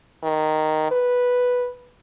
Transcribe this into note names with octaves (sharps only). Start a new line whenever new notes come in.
D#3
B4